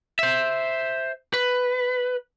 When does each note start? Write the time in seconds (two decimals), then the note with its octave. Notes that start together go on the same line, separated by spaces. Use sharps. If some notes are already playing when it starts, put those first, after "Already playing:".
0.19 C5 E5
1.34 B4